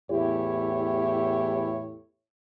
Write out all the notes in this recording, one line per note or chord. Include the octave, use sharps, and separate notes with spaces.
E2 A2 E4 G4 C#5